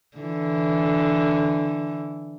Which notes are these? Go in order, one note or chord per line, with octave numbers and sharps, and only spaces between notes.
D3 E3